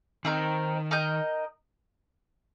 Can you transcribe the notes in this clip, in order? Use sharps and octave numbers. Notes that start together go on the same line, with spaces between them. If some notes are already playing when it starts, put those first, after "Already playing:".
D#3 C4 D#4 A#4
D#4 A#4 D#5 G5